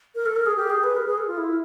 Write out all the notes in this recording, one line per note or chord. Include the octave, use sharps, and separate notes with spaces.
A#4
A4
A#4
G#4
G4
G#4
B4
A#4
G#4
A4
F4
E4